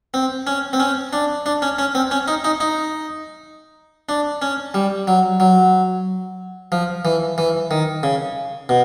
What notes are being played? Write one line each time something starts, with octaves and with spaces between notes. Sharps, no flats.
C4
C#4
C4
C#4
D4
D4
C#4
C#4
C4
C#4
D#4
D#4
D#4
D4
C#4
G3
F#3
F#3
F3
E3
E3
D#3
C#3
B2